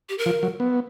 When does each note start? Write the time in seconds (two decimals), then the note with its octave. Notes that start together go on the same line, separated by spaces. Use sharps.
0.09 G4
0.18 A#4
0.26 F3
0.43 F#3
0.60 B3